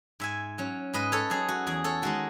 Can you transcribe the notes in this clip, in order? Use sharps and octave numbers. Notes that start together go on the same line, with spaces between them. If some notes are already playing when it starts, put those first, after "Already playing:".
G#2 E5 G#5
F#3 C#4
G#2 B4 D#5
A4 C#5
F#3 C#4 G#4
F#4
E2 G#4
A4 C#5
D#3 G#3 D#4 F#4